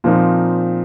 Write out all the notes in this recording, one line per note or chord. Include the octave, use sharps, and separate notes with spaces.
A#2 F3 C4 D#4 A#4